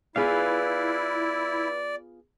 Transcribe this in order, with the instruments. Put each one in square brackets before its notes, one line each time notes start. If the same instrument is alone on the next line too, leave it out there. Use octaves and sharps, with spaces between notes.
[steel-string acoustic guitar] B3 F4 G#4 [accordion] E4 [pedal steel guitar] B4 F5 [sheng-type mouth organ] D5